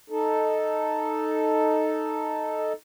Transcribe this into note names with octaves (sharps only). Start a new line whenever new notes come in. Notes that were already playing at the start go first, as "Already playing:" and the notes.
D#4 A4